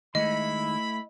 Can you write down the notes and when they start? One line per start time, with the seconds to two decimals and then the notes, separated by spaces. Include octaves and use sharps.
0.15 D#3 G#3 A3 D#4 E4 D#5 B5